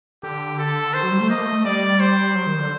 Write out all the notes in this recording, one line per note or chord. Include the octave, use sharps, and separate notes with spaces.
D3 G4
A4
D#3 C5
F#3
G3
A3
A#3 D#5
A3
A3
G3 D5
C5
F#3
D#3
D3